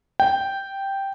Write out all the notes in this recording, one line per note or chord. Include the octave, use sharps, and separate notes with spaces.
G5